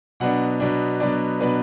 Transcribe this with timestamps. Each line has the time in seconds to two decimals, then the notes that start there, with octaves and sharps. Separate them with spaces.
0.20 B2 F#3 B3 D4 F#5
0.60 B2 F#3 B3 D4
1.00 B2 F#3 B3 D4 D5
1.40 B2 F#3 B3 D4 B4